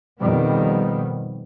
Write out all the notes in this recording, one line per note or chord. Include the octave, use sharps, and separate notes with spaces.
F2 B2 D#3 G3 B3